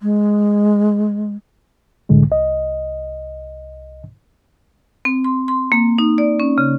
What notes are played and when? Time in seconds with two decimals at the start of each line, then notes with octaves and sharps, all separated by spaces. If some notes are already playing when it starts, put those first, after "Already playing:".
0.01 G#3
2.09 C2 F2 A2 D3 G#3
2.30 C2 D#5
5.05 C4
5.24 C6
5.48 C6
5.72 A#3
5.98 D#4
6.18 D5
6.40 C#4
6.58 C#3